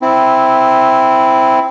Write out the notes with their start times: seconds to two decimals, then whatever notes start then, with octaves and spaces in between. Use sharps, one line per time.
0.02 C4 E4